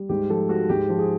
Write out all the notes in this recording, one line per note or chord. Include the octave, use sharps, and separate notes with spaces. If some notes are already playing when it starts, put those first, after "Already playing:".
Already playing: G3
G#2 G4
F3 A4
G#3 F#4
G#2 G4
F3
G#4